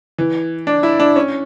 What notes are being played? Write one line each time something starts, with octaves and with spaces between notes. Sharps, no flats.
E3
D4
E4
D4
C#4